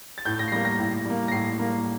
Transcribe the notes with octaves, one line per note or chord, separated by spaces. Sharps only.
A6
A2 G6
A#6
C7
G3 A#3 A#6
A#6
A2
G3 A#3
A#6
A2 C7
G3 A#3